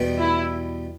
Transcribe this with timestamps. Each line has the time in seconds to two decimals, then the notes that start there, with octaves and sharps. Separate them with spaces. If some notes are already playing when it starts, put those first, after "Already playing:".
Already playing: E2 B2 G3 B3 D#4
0.19 E4